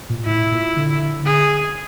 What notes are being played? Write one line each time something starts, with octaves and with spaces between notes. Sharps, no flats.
A#2
A2 E4
A#2
D3
G#4